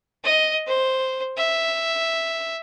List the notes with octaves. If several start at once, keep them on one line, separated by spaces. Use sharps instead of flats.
D#5
C5
E5